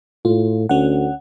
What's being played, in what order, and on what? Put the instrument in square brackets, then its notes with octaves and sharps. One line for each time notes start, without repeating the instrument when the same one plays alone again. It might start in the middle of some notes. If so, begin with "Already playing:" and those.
[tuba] A2 [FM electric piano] F4
[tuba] D2 [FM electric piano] C#4 F#5